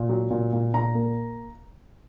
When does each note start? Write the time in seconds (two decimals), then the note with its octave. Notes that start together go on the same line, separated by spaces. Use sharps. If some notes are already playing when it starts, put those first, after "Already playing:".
Already playing: A#2
0.09 F#3
0.31 A#2
0.53 A#2
0.73 A#2 A#5
0.95 A#3